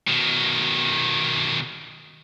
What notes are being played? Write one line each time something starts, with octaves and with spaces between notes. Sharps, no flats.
B2 D#3